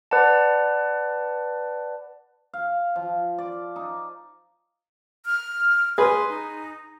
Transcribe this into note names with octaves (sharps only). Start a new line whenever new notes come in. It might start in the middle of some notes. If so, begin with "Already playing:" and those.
B4 D5 F#5 A5
F5
F3
D5
D#4
F6
G#4 B4 C6
D#4